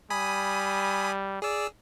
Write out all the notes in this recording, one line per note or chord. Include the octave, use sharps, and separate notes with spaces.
G3 G#5 B5 D#6
G#4 D5 E6